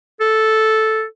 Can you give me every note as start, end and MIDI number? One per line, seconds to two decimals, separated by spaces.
0.21 1.05 69